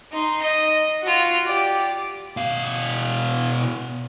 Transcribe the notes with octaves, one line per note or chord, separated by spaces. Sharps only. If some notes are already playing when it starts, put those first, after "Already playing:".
D#4 C6
D#5
F4 F#4
G4 D5
B2 F5